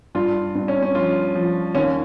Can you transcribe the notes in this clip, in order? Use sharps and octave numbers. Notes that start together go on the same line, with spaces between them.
G2 F4
G2
C#4
C#4
F3 F4
F3
D#2 C#4